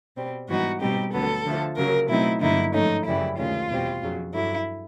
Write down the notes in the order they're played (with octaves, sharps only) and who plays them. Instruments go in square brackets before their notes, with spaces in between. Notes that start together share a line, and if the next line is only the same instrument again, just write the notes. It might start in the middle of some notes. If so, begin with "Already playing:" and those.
[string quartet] B2 G3 C4
G#2 E3 G3 B3 D#4 F#4
B2 G3 C4 D#4 G4
D2 D3 F#3 B3 A4
D3 F3 A3
C#3 F#3 A#3 A#4
B2 F#3 A3 C4 D#4 E4
G2 D3 F#3 A#3 D#4 E4
G#2 F3 A3 C#4 D#4
F#2 C#3 E3 G3 E4
D2 C3 D#3 G#3 C#4 F4
E2 B2 G3 C4
F2 C#3 F#3
G2 D3 F#3 E4